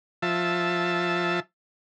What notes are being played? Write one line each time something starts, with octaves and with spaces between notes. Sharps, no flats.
F3 E5 A5